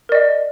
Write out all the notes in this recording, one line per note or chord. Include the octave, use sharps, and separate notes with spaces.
A#4 D5 D#5